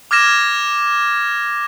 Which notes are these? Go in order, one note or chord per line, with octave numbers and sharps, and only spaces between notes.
D6 F6 G#6 A#6 E7